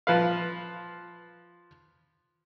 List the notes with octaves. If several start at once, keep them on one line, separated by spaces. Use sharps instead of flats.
F3 B4 F5